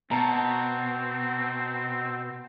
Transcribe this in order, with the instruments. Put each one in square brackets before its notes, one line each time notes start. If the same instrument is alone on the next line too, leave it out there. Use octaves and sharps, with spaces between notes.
[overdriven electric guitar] B2 [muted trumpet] C4 [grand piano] A5 A#5